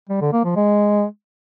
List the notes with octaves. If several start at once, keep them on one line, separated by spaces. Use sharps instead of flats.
G3
D3
A#3
F3
G#3